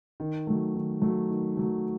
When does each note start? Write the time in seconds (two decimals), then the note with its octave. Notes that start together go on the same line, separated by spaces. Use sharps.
0.20 D#3
0.47 F#3 A3
0.74 D#3
1.02 F#3 A3
1.30 D#3
1.57 F#3 A3